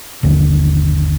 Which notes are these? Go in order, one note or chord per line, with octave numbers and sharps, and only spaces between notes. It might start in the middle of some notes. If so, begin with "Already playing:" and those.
G1 D#2 D3